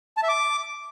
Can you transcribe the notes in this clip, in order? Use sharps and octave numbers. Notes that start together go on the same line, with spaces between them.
A5
E5
D6